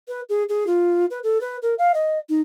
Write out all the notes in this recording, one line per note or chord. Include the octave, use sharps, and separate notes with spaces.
B4
G#4
G#4
F4
B4
A4
B4
A#4
F5
D#5
D#4